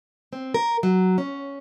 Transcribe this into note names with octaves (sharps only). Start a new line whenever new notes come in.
C4
A#4
F#3
C#4